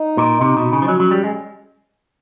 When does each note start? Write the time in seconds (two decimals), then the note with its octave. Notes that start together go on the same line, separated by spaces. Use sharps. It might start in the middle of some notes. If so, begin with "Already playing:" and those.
Already playing: D#4
0.17 A#2
0.40 C3 D#4
0.57 B2
0.73 C#3
0.82 F3
0.88 F#3 C#4
1.00 F#3
1.11 G3
1.24 G#3